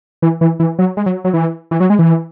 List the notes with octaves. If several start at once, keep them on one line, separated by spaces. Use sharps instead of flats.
E3
E3
E3
F#3
G#3
F#3
F#3
E3
E3
F#3
G#3
E3